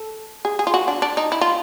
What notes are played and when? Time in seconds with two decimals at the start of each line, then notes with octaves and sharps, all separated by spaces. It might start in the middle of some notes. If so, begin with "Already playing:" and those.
Already playing: A4
0.45 G#4
0.59 G#4
0.67 F4
0.74 F#4
0.88 D4
1.02 D4
1.17 D#4
1.32 E4
1.41 F4